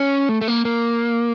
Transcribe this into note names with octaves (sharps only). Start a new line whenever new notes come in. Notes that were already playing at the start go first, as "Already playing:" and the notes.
Already playing: C#4
A3
A3
A#3
A#3